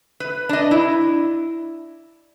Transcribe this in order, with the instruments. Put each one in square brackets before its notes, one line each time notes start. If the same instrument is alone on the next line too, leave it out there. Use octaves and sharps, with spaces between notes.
[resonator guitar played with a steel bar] B4
D4 D#5
E4